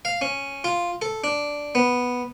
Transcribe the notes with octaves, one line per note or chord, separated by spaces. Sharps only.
F5
C#4
F4
A4
D4
B3